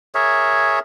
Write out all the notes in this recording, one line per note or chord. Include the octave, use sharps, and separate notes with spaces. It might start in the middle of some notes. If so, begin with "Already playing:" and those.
G#4 A#4 C#5 E5